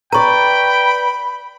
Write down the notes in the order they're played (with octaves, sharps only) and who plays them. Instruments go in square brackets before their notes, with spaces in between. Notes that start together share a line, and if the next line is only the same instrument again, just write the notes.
[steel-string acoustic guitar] B4 D5 [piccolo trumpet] G5 [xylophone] A#5 C#6 [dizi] B5